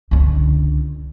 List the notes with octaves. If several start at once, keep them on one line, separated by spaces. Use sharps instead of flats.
C#2 D3